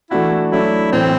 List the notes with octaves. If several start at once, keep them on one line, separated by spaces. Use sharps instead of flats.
E3 A3 D4 E4 F#4
F#3 A3 D4 E4
A2 E3 A3 C4